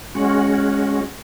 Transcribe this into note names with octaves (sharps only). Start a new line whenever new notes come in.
G#3 C#4 F#4